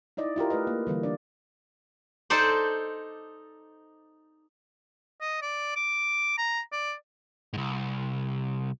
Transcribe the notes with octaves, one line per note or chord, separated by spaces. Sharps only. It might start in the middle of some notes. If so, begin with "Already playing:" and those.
D#4 E4 D5 D#5
E4 F4 G4 A#4
A3 G4 B4 D#5
A#3
D3 E3 G3 A#3
E3 D4 D5
D#4 A4 C5 D5
D#5
D5
D6
A#5
D5
C2 G#2